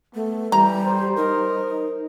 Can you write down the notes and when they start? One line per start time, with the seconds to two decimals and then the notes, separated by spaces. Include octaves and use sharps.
0.15 A3 B3
0.52 E3 G3 G4 A#5
0.85 C5
1.17 D#4 A#4